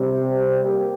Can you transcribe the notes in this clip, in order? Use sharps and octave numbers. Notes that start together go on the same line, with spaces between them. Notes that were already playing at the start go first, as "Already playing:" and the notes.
Already playing: C3 G3 C4
A#3 G4